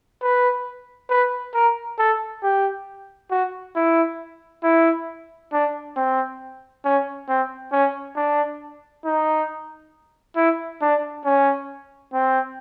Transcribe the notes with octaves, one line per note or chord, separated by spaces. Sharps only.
B4
B4
A#4
A4
G4
F#4
E4
E4
D4
C4
C#4
C4
C#4
D4
D#4
E4
D4
C#4
C4